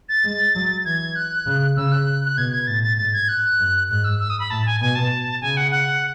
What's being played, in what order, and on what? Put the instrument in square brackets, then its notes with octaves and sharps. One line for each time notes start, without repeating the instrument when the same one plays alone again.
[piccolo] A6
[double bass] G#3
F#3
[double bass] E3 [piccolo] G#6
[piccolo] F#6
[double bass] C#3
[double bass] C#3 [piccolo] E6
[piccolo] F#6
F#6
[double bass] B2 [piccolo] G#6
[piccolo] G#6
[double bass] A2 [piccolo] A6
[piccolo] A6
[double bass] G#2 [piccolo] A6
[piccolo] G#6
F#6
[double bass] F#2
[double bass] G#2 [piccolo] F#6
[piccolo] E6
E6
D#6
B5
[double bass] A2 [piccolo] A5
[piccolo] G#5
[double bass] B2 [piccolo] G#5
[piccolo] A5
[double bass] C#3 [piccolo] G#5
[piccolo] F#5
F#5